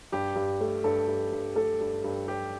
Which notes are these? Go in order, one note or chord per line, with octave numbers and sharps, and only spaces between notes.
G2 G4
G2
A3
G2 A4
G2
G2
A3 A4
G2
G2
G2 G4